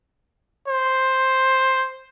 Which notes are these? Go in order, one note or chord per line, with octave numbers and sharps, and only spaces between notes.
C5